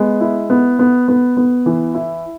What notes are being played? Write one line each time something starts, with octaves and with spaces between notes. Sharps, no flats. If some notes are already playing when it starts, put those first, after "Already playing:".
Already playing: G#3 B3
E4
B3
B3
B3
B3
E3
E4